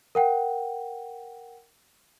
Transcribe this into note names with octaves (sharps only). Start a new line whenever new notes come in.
A#4 F#5 G5